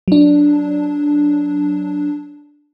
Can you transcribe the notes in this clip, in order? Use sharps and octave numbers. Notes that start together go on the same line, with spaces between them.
F#3 D4